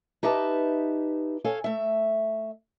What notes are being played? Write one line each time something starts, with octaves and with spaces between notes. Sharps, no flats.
D#4 G4 B4 E5 A5
A4 C#5 F5 G#5
A3 E5